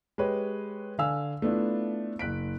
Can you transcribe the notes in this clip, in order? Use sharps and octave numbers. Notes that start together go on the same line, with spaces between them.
G#3 G4 B4 C#5
D3 F5 G#5 E6
A3 B3 D4 E4 F4
F#1 F#6 B6 D7